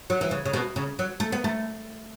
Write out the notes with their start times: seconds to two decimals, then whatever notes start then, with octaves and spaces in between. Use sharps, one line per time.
0.10 F#3
0.21 E3
0.31 C#3
0.45 C#3
0.53 B2
0.76 C#3
0.99 F#3
1.20 A3
1.32 B3
1.44 A3